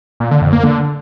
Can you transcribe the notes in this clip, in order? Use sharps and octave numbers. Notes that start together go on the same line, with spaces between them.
A#2
D3
F2
A#3
D3